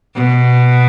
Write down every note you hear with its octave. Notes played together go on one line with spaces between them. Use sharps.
B2